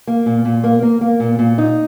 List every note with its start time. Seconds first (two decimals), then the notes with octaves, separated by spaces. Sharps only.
0.07 A#3
0.26 A#2
0.45 A#2
0.64 A#3
0.83 A#3
1.01 A#3
1.20 A#2
1.39 A#2
1.58 D#4